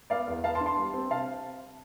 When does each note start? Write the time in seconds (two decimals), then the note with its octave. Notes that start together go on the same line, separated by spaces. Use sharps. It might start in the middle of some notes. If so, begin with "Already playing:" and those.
0.10 B3 D5 F5
0.28 E2
0.44 B3 F5 A5
0.55 A5 C6
0.60 D4
0.66 A5 C6
0.77 G3
0.93 C4
1.10 C3 F5 A5